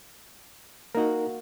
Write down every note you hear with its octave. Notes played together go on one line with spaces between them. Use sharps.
A#3 D#4 F#4 A#4